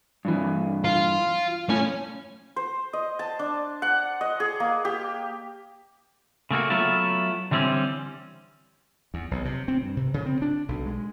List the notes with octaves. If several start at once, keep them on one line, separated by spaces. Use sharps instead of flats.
G2 E3
F4
A2 C#4
C5
D#5
A5
D4
F#5
D#5
G#4
A#3
G4
C#3 A3 A#3 F#4
F#3 A3 B3 E4 F4
D3 E3 G3 C4 C#4
E2
B1
C3
C4
G2
C3
C#3
C4
D4
B1
G#3